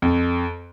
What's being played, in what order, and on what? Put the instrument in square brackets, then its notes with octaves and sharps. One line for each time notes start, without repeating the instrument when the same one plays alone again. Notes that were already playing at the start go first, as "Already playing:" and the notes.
[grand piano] F2